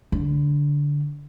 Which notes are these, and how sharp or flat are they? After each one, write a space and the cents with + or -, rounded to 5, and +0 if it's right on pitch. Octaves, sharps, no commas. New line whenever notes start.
D3 -15